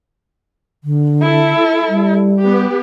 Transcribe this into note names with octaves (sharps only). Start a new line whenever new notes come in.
D3
E4 A4
G3
B3 G4